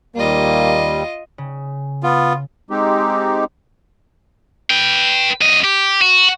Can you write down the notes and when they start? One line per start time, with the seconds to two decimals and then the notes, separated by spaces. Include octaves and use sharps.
0.16 D#2 G3 A#3 F4 D#5
1.38 C#3
2.03 B3 F4
2.70 G#3 C4 D#4 G4
4.70 B4 G5
5.41 F#2 D#5
5.64 G4
6.01 F#4